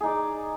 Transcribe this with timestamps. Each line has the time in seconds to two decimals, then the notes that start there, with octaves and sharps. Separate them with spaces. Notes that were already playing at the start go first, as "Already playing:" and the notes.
0.01 G#4
0.03 D#4
0.06 D5